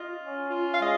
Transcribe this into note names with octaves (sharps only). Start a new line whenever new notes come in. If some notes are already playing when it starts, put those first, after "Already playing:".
Already playing: F4 D#5
C#4
F4
F5
G#3 D#5